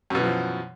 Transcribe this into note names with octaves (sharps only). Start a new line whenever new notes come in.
F#2 B2 E3 F3